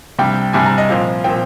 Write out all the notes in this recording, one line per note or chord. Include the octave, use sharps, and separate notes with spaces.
C3 G3 D4 G5
C3 G3 D4 G#5
A#5
D#5
A#2 F3 C4 F5
A#2 F3 C4 G5